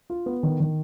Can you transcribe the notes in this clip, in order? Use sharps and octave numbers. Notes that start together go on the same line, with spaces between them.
F4
B3
D#3
D#3